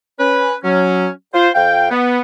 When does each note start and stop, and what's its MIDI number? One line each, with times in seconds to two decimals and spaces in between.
0.19 0.54 61
0.19 0.54 71
0.64 1.08 54
0.64 1.08 61
1.34 1.50 65
1.34 1.50 72
1.55 1.90 41
1.55 1.90 77
1.55 1.90 79
1.90 2.20 59